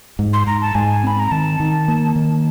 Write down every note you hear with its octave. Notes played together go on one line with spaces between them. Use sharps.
G#2
C6
G#2 A#5
A5
G#2 G#5
C4 B5
A#5
D#3 A5
D#3
A#3
D#3